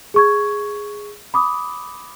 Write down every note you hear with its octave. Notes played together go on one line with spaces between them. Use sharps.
G#4 C#6 G#6
B5 D6 D#6